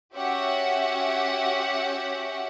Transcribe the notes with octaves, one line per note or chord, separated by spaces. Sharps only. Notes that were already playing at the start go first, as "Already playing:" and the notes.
C#4 F#4 G4 E5 F#5